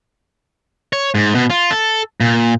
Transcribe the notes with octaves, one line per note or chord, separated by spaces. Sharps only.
C#5
G#2
B2
F4
A4
A#2